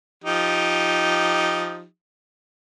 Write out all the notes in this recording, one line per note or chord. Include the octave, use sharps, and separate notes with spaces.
F3 D#4 G4